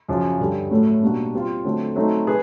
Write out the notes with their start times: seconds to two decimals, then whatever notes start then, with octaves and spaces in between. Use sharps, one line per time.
0.09 F#2 C#3 F3
0.40 G2 D3 G3
0.71 A2 F#3 A3
1.02 B2 G3 A#3 D4 F#4
1.34 G3 C4 F4
1.64 D3 F#3 A3 C4
1.96 F#3 A3 C4 D#4
2.27 G#4 B4